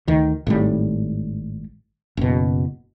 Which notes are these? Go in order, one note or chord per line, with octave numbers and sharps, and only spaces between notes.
D2 D#3
G#1 A2 G3
F#1 B2